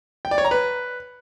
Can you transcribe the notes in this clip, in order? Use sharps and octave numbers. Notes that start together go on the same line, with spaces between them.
G5
D5
C#5
A#5
B4